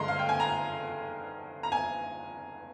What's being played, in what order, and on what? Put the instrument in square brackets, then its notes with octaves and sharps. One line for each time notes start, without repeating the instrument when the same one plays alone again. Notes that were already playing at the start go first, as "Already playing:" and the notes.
Already playing: [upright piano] G2 D3 G#3 A#5 C6
F5
G5
G#5
A#5
A#5
G#5